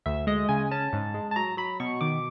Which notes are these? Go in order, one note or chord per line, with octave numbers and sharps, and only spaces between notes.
D2 E5
G#3 D#5
C#3 G#5
C#4 A5
G#2
G#3
A5
F#3 A#5
F#3 B5
B2 C#6
D#3 D6